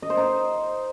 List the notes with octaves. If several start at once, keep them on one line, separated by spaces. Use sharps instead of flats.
D#5
C5
D#4